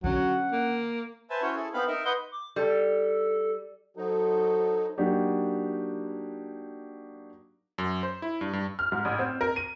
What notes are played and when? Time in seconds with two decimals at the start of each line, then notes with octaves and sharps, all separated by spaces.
0.04 D3 F#3 C#4 F#5
0.52 A#3
1.30 B4 C5 E5 G#5 A5
1.42 C#4 E4 F#4 C5 C#5
1.55 E4 G#4 A4
1.74 B3 C4 D#4 F5 B5
1.88 D#4 A#4 E5
2.05 B4 D#5 F#5 C6 G6
2.32 D6
2.56 G3 A4
3.97 F#3 D#4 F#4 A4 C5
4.98 F#3 A#3 D4 D#4 F#4 G4
7.78 F#2
8.03 C5
8.22 E4
8.41 G2
8.53 G2
8.79 F6
8.92 G#2
9.05 A1
9.19 C4
9.41 A#4
9.56 D#7